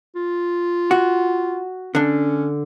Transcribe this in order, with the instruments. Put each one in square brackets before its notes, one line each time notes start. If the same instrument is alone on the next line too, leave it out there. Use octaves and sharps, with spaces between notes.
[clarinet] F4
[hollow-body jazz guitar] F#4
[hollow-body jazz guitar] D3 D4 [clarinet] C#4